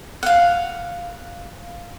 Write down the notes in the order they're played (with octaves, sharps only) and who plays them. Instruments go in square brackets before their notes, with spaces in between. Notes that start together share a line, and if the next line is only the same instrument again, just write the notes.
[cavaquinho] F5 F#5